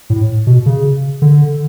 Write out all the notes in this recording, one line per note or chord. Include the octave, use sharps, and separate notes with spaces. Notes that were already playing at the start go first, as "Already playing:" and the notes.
A2
B2
C#3
D3